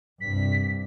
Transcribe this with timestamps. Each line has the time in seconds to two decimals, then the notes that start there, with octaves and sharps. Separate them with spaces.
0.21 C2 G2 B6